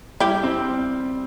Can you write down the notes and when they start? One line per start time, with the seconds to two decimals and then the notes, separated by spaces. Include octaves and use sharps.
0.20 G3 E4 G4
0.43 C4